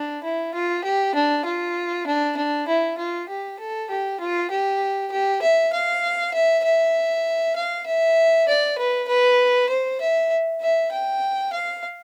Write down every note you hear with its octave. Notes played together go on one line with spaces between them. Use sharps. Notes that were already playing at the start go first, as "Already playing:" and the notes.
Already playing: D4
E4
F4
G4
D4
F4
D4
D4
E4
F4
G4
A4
G4
F4
G4
G4
E5
F5
E5
E5
F5
E5
D5
B4
B4
C5
E5
E5
G5
F5